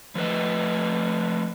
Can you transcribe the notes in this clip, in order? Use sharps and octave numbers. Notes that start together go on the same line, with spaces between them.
F3 A3 B4 D#5